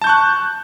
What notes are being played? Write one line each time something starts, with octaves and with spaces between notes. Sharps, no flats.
A5 C#6 F#6 G6